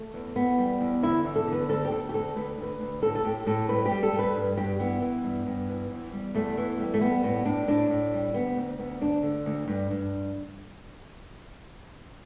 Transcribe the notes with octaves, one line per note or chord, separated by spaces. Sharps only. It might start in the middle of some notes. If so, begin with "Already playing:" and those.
Already playing: A3
E2
E2 B3
G3
E2
D3 E4
E2
A4
D3
B4
D2 A4
G4
D2 A4
G4
D2 A4
D2 B4
D2
B4
D2
A2 A4
A4
A2 G4
A2 A4
G3 B4
G4
G3
A4
G3
B4
G2
G2 G4
E3 B3
E3
G2
G2
E3
E2
G3
E2 A3
E3
G3
A3
G3 B3
A2 B3
A2 D4
A2 D4
A2
G3
D2 B3
D2
D2 B3
D2 D4
D3
D2
G2
G2